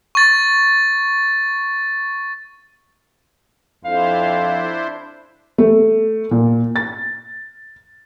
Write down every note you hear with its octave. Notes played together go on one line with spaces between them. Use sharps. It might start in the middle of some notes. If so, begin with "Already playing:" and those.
C#6 A6
F2 D4 E4 C5 F5
A3
A#2
A6